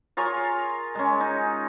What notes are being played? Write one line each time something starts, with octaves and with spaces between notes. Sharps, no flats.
F4 G#4 A#4 C#5
G#3 C#4
D#4